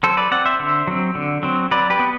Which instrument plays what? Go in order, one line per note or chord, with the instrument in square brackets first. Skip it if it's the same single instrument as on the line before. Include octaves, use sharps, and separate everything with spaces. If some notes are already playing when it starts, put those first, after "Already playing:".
[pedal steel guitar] F#3 A4 C5
B4 D5
C4 D5 F#5
C5 E5
D3
F#3 C4
D3
F#3 C4
F#3 B4 D5
G4 B4
B3